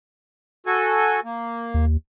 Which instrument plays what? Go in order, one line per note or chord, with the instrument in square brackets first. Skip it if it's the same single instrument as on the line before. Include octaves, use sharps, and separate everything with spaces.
[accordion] F#4 A4 G#5
A#3
[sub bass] D#2